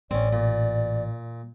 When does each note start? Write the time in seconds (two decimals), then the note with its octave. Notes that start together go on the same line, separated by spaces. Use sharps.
0.11 A1 C4 C#4 D5
0.33 A#2